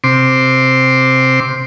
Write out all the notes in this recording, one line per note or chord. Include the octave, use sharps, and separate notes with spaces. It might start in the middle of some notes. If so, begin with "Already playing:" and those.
C3 C6 D6